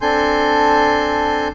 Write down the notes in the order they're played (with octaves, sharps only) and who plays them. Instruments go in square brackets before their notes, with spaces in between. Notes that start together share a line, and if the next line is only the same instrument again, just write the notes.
[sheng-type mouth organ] C4 D4 A4 G#5 C6 G6